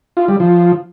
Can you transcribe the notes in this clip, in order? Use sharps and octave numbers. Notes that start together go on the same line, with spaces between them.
F4
G3
F3